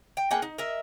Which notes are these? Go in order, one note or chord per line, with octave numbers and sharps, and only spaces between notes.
G5
A#3 G#4 F#5 G5
D#4
A#4 D#5 E5